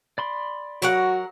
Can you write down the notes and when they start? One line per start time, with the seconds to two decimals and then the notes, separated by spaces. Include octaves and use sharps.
0.18 D5 B5 C6
0.82 F#3 F#4 A#4 F#5